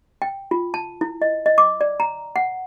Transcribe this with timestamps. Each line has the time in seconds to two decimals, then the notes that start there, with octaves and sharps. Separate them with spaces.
0.22 G5
0.51 F4
0.74 A5
1.01 E4
1.22 D#5
1.46 D#5
1.58 D6
1.81 D5
2.00 A#5
2.36 F#5